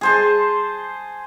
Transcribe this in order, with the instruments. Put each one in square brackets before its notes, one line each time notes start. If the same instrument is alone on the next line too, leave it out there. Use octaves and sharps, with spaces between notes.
[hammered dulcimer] G#4 C5 A5